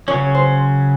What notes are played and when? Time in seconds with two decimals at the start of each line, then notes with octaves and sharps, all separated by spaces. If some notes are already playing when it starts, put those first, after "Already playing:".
0.08 C#3 F#3 C#4 C#5
0.35 C5